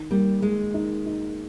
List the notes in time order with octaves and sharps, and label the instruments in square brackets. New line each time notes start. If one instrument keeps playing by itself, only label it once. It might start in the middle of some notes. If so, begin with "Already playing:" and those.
Already playing: [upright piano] D#3
[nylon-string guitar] G3 [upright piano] A#3
[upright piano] D#3 [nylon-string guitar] G#3
[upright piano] D#4
D#4